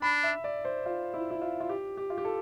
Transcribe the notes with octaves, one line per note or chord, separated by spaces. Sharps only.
D4 B5
E5
D5
C5
F4
E4
E4
F4
F4
G4
G4
F4
G4
A4